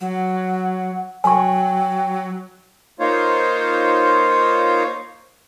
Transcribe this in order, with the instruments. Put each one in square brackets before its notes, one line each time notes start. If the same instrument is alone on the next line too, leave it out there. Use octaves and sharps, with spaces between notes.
[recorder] F#3 [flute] F#5
[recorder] F#3 [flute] G5 [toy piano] G#5 C#6
[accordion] A#3 D#4 F4 C5 C#5